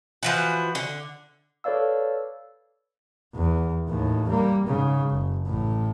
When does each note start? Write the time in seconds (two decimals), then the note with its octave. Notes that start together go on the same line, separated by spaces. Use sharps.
0.23 E3 F3 F#4
0.75 D3
1.64 A4 B4 C#5 D5 F5 E6
3.35 E2
3.88 D#2 A2
4.29 G3 A#3
4.67 G#2 C#3
5.10 F#1
5.46 A1 A2